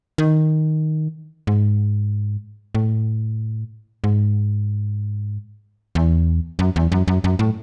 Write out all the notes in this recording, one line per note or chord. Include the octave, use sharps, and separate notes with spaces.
D#3
G#2
A2
G#2
E2
F#2
E2
F#2
F#2
F#2
A2